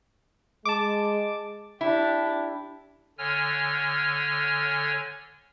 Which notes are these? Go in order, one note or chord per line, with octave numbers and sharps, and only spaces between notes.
G#3 A5 D6
D4 E4 G4
D3 C#5 G#5 F6